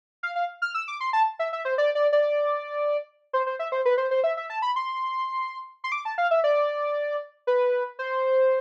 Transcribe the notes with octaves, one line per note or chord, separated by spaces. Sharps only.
F5
F5
F6
E6
D6
C6
A5
E5
E5
C5
D5
D5
D5
C5
C5
E5
C5
B4
C5
C5
E5
E5
A5
B5
C6
C6
D6
A5
F5
E5
D5
B4
C5